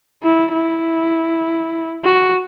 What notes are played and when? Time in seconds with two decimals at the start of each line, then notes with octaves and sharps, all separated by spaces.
0.23 E4
0.53 E4
2.04 F#4